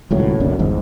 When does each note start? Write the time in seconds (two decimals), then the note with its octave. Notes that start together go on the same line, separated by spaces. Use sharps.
0.11 D#1 C#2 A2 F#3
0.40 F#1 B1 F#2 D3
0.59 G1 E2 G#2